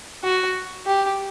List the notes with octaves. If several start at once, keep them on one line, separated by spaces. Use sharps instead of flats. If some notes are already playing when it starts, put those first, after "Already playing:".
F#4
G4